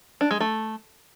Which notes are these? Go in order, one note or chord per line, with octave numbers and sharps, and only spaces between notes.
D4
G#3
A3